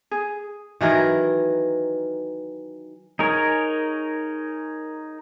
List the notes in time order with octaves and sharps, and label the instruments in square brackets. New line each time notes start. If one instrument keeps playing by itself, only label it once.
[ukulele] G#4
[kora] D#3 E3 F#3 A#4
[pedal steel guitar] D#4 G#4 A#4 C#5